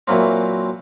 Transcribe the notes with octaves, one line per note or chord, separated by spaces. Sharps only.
A#2 E3 F#3 A#3 C4